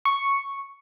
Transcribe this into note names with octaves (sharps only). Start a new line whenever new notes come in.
C#6